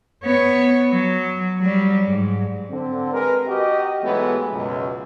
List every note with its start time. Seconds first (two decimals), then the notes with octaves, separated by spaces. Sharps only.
0.24 B3 C#5
0.90 F#3
1.59 F#3 G3
2.07 G#2
2.69 D3 C4
3.12 G#3 A#4 B4
3.45 F#4 G4 D#5
4.01 G#2 E3 F#3 G#3 A3 B3
4.51 C#2 F#2 B2